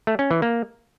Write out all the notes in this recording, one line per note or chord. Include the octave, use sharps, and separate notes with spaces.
A3
C#4
E3
A#3